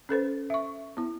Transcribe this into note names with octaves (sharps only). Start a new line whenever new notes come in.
C#4 A4 B4 C5
E5 C#6
B3 E4